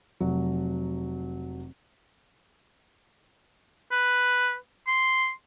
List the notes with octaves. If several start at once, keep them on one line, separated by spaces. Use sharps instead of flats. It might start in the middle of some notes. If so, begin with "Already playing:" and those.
F1 F#3
B4
C6